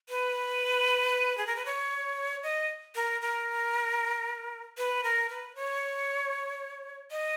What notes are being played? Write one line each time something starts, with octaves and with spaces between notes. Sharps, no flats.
B4
G#4
A#4
B4
C#5
D#5
A#4
A#4
B4
A#4
B4
C#5
D#5